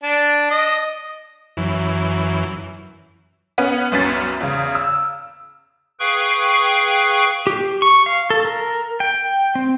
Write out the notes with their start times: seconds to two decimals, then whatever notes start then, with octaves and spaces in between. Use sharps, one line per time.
0.03 D4
0.51 D#5
1.57 F#2 E3
3.58 B3 C#4 F#5
3.92 C2 F#2 B3 C#4 A6 B6
4.40 E2 C#3
4.75 E6
5.99 G#4 B4 F5 G5 C#6
7.47 G4
7.82 C#6
8.06 F5
8.30 A4
8.45 A#4
9.00 G5
9.55 C4